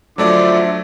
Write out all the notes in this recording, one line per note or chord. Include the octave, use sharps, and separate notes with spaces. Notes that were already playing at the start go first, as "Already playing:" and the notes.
D3 F3 F#3 A3 C5 D5 E5 D6